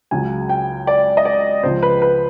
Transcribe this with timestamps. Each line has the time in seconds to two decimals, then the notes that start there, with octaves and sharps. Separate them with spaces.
0.11 C#2 C#3 F#3 G#5
0.49 G5
0.87 D5
1.17 D#5
1.25 D5
1.63 C#2 C#3 F3 C5
1.83 B4
2.02 B4